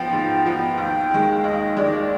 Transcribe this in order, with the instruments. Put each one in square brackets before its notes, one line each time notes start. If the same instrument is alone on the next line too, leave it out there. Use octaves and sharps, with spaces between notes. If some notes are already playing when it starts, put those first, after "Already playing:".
Already playing: [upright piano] G#2 F3 B3 [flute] G5
[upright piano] G#2
F3 B3
D#2
D#3 G#3
[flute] F5
[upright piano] D#2 [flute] D#5
[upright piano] D#3 G#3 [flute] D5